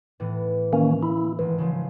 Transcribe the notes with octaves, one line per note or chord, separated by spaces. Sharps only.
A2 E3 B3
D#3 A#3 C#4 F6
E4
G#1 E3
C#3 F3